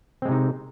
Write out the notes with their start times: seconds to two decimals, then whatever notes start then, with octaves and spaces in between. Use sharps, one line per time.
0.22 C4
0.25 G#3
0.28 C3
0.32 D#4